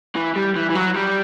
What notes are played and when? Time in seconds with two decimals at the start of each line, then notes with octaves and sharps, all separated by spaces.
0.15 E3
0.36 G3
0.56 E3
0.70 E3
0.75 F#3
0.96 G3